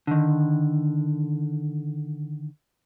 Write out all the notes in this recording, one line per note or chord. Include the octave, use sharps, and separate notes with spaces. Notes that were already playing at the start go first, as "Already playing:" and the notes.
D3 D#3